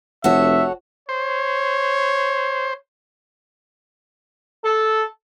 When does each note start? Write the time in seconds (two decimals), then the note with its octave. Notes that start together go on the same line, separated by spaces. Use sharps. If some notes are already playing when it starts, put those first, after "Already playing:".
0.24 F1 F#4 A4 C#5 E5
1.09 C5 C#5
4.64 A4